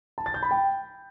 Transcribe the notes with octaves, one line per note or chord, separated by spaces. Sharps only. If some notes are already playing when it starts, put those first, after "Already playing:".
A5
A6
G6
B5
G5